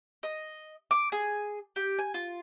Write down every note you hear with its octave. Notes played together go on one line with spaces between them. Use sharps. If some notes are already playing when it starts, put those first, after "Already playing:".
D#5
D6
G#4
G4
G#5
F4